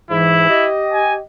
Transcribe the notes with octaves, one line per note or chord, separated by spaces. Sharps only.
G#2 E3 E4
G4 D#5
G#5